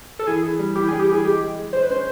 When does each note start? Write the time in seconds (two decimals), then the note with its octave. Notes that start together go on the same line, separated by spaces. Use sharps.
0.19 A4
0.27 E3 G#4
0.43 E3
0.59 G3
0.75 E3 G4
0.88 G3 G#4
0.99 G4
1.08 E3 G#4
1.24 G#3 G4
1.40 G#3
1.57 G#3
1.73 G#3 C5
1.83 B4
1.89 C#4 C5